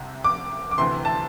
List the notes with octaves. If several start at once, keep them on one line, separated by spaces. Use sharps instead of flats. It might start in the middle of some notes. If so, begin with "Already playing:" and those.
Already playing: C2 C3
D6
D6
D2 C3 E3 C6
A5